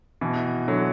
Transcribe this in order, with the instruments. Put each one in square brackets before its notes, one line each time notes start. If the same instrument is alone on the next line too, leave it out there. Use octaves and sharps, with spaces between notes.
[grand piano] B2 E3
D3 F#3